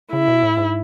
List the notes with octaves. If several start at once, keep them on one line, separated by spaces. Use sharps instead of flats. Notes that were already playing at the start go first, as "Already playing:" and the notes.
C#3 E4
B2
A2
G#2